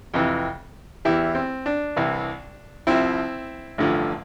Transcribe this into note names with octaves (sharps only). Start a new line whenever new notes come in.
F2 C3 E3
E2 E3 E4 G4
C4
D4
C2 C3 E3
C2 C3 F3 C4 E4
A1 G2 D3 F3